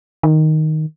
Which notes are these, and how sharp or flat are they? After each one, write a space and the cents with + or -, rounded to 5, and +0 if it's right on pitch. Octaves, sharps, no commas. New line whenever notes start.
D#3 +0